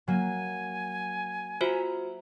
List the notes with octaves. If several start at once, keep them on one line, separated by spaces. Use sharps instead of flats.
F#3 A#3 G#5
F4 F#4 C5 E5 A#5